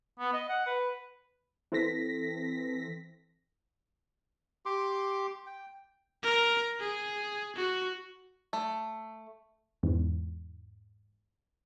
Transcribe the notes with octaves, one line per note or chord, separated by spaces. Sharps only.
B3
D#5
F#5
B4
E3 C4 A4 A#6 B6
G4 C6 D6
G5
A#4
G#4
F#4
A3
E2 G#2